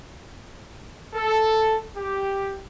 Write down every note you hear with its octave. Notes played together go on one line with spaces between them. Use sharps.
A4
G4